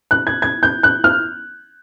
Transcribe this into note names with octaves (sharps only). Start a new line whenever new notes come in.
F#6
G#6
G#6
G6
F#6
F6